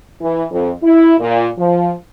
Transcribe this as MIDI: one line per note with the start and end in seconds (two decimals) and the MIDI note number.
0.21 0.44 52
0.51 0.71 41
0.83 1.15 64
1.20 1.47 46
1.58 1.91 53